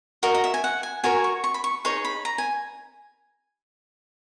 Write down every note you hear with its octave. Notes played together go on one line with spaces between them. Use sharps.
F#4 A#4 D#5
D#5
E5
G#5
F#5
G#5
F#4 A#4 C#5 G#5
C#6
C#6
B5
C#6
D#4 G#4 C#5 C#6
B5
A#5
G#5